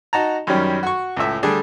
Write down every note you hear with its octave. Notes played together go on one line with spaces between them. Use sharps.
D#4 F#4 A5 A#5
F#2 D#3 G3 C#4
F#4 C#6
C#2 A2 E5
D3 G3 A3 D4 G#4